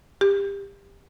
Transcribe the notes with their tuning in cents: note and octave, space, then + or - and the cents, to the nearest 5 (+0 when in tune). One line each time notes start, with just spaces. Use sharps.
G4 +20